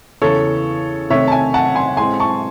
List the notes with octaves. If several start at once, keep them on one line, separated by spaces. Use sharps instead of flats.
E2 C#3 E3 A4 C#5
C3 D#3 A3 C4 C#5 E5
A5
E5 G#5
F#5 A5
G#5 C6
A2 G#3 C4 G#5 C6
A5 C#6